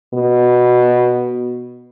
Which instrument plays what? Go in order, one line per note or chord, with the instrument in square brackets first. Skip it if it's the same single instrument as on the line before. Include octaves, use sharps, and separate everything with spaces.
[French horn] B2